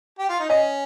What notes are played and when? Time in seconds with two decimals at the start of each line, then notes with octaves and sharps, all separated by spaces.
0.19 G4
0.30 F4
0.40 D#4
0.49 C#4 D#5